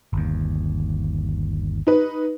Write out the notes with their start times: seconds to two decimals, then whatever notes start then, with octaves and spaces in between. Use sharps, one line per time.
0.13 G1 D#2
1.87 D#4 B4